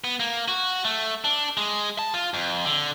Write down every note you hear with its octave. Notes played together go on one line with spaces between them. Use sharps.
B3
A#3
F#4
A3
D4
G#3
A5
F4
F2
D3